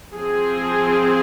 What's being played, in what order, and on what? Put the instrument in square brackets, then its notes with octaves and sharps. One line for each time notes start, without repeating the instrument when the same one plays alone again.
[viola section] F3 C4 G#4